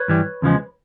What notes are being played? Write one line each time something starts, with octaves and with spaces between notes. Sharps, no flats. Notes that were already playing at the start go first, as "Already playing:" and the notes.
Already playing: B4 C#5
G2 E3 G3
E2 C#3 F3 G#3